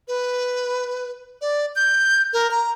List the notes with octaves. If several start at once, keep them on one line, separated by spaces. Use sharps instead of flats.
B4
D5
G6
A#4
A#5